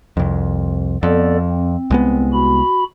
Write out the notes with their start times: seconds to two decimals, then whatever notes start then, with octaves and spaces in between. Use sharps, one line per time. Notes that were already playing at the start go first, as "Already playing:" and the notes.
0.17 C2 F2
1.03 F2 B3 A4 D5
1.50 C4
1.90 C2 G#3 B3
2.33 F#4 B5